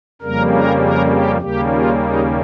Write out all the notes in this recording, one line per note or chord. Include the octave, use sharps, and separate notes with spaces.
F2 C#3 G3 A#3 A#4
A#4
A#4
G4
D#2 C#3 G3 A#3 G4
F4
D#4